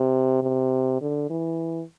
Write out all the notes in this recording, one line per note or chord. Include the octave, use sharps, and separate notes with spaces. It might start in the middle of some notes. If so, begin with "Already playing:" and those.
Already playing: C3
C3
D3
E3